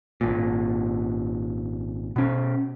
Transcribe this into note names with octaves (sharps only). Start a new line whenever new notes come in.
G#1 A#2
B2 C#4